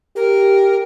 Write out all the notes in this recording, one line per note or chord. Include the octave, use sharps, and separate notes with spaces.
G4 A#4